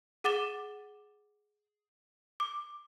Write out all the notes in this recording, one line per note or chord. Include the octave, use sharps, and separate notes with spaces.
G#4 F#5 D6 A6 E7 G7
D6